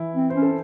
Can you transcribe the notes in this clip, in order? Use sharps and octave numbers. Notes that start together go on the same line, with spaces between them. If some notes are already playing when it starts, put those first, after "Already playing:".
Already playing: E3 E4
C4
C#4 C5
A4